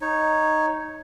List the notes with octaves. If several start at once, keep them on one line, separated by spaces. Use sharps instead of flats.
D#4 C#5